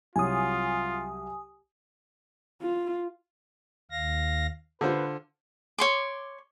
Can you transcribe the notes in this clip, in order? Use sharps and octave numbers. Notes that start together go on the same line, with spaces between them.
C2 F#3 F4 C#5 G#5 D#6
F4
D#2 F5 A#6
D3 F4 B4 C5
C#5 C6 D6